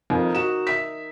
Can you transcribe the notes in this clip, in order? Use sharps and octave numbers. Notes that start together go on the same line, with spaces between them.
F2 D#4 A#4
F#4 E7
E5 B6